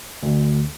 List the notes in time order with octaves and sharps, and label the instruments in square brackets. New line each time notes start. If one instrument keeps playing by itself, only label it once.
[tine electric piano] D2